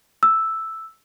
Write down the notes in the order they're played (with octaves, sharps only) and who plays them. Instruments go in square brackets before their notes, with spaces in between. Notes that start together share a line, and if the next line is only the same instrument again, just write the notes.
[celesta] E6